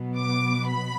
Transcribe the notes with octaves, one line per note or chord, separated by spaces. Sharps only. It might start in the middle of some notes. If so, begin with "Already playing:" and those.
Already playing: B2 F#3 B3
D6
B5